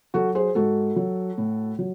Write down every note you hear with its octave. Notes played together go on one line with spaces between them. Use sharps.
F#3 F#4 A4
G#4 C5
G#2 F#4 A4
F#3
A2
F#3